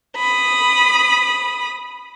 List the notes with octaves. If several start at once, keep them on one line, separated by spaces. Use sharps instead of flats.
B5 D#6